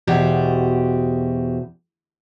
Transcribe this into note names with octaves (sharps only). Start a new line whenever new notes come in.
E2 B2 F#4 G4 C5